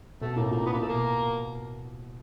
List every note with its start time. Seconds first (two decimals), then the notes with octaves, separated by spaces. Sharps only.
0.21 B2 A3
0.36 A2 A#3
0.51 A#2 A#3
0.66 A#2 B3
0.73 A#3
0.81 B2 A3
0.89 A#3